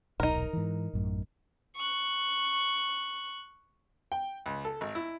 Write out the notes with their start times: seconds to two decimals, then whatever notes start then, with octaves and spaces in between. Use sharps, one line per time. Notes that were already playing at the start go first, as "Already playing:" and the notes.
0.20 D#1 B1 D#4 A#4
0.53 G#2 E3
0.93 A1 F#2 A2
1.77 C#6 F#6
4.12 G5
4.46 C#2
4.65 A4
4.81 G#1
4.95 E4